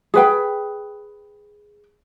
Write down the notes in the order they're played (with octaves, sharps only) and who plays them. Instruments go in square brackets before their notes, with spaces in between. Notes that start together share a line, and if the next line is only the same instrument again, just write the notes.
[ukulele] G#4 B4 G5